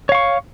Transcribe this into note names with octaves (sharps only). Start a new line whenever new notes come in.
C#5 F5 C#6